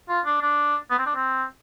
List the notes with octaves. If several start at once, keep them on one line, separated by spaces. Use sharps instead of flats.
F4
D4
D4
B3
C4
D4
C4